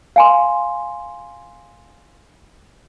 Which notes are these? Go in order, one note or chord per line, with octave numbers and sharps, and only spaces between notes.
F5 G#5 C6